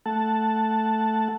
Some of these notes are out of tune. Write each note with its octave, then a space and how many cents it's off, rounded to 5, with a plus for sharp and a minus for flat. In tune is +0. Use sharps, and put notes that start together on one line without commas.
A3 +0 F#5 +0 A5 +0